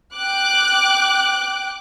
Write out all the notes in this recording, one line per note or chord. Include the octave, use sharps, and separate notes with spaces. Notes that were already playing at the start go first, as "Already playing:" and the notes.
G5 D6 F#6